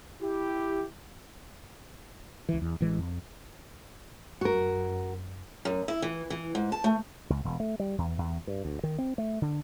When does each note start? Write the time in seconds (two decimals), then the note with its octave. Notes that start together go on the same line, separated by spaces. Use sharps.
0.22 E4 G4
2.49 C#2 E3
2.62 E2
2.81 A1 E3 G#3
2.98 F2
4.41 F#2 F#4 A#4
5.65 F#2
5.88 E4
6.02 E3
6.30 E3
6.55 G#2
6.72 A5
6.84 A3
7.30 C#2
7.45 E1
7.60 A3
7.80 G3
7.98 E2
8.18 E2
8.47 G2
8.65 D2
8.83 D#3
8.98 C4
9.18 A3
9.42 D3